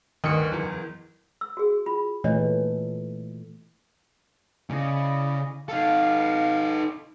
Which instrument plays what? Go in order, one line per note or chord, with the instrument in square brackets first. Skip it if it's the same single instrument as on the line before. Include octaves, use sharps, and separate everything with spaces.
[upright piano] D2 G2 C#7 [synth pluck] D#3
[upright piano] F#1 E2
[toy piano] E6
F#4 G#4
F4 B5
[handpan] A#2 E3 A3 [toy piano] D4 C#5 D#5
[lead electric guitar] C#3 [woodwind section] E4 D5 D#5
[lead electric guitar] D#4 A4 [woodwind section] F5